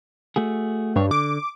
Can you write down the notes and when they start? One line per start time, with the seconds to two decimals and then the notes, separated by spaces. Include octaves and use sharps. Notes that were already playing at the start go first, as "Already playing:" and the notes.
0.36 A3 F#4 G#4
0.96 G2 D4 C#5
1.11 D3 D6